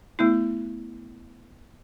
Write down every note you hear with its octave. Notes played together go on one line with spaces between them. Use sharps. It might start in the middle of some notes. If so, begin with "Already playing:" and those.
A3 B3 E4